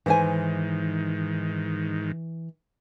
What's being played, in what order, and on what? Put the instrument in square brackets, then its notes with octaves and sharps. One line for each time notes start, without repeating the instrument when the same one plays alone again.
[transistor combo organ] G#2 D#3 [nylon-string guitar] E3 C5 G#5